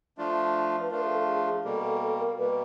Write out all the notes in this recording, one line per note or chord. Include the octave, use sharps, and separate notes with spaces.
F3 A3 D4 F4
B4
F3 A3 D4 F4 A#4
G#4
A4
G#4
G#4
B2 G3 A#3 A4
A4
A4
A#4
B2 G3 A#3 B4